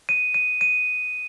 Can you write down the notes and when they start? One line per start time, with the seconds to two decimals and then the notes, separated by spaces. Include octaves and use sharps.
0.09 D#7
0.34 D#7
0.61 D#7